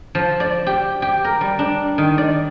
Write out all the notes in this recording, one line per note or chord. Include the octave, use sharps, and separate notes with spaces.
F3
D5
G4
G4
A#4
G3
D4
D#3
D5